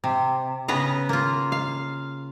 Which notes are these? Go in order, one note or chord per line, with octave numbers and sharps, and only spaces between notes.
C3
C#3 B3 B4 A#5
A#3 F4
F5